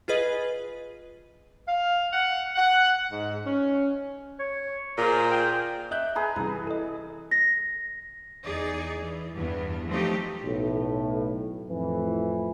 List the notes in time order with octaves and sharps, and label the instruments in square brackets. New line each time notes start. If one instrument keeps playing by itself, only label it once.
[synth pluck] F4 G#4 B4 D#5
[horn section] F5
F#5
F#5
G#2
C#4
[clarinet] C#5
[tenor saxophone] A#2 [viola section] F4 G#4 C5 [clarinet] A#5
[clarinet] G5
[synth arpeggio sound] D#5 F#6 G6 [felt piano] E5
[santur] G#4 B4 A#5
[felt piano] C2 E3 [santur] B4
[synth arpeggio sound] A4 D#5
[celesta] A#6
[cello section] E2 D#4 G#4 D5
E3
E2 G2 E3 B3
F3 F#3 A3 C4 D#4 G4
[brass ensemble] B1 A2
F2 A2 E3